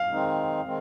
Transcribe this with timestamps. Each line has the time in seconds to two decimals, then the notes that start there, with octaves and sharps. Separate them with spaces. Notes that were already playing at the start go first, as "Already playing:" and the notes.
Already playing: F5
0.10 D#3 G#3 C4 D#4
0.65 D#3 G#3 C4